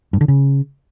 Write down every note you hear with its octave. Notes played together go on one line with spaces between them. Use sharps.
G2
D3
C#3